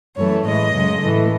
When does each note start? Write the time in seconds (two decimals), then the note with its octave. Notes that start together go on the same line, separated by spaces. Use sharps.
0.16 F#2 E3 A3 C#5
0.44 A2 E3 G#3 D#5
0.73 F#2 C#3 G#3
1.01 A2 E3 A3